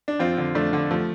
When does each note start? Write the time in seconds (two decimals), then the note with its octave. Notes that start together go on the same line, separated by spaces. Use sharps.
0.08 D4
0.19 F2 C4 F4
0.37 D3
0.55 F2 A3 D4
0.73 D3
0.91 F3 A3